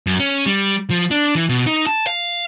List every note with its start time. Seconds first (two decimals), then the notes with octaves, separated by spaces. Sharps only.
0.07 F#2
0.20 C#4
0.46 G3
0.90 F3
1.11 D4
1.35 E3
1.49 B2
1.67 D#4
1.86 A5
2.07 F5